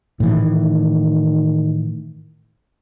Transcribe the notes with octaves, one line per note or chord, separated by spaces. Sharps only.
A2 D#3 E3